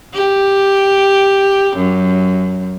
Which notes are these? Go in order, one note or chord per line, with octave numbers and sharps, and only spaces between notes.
G4
F#2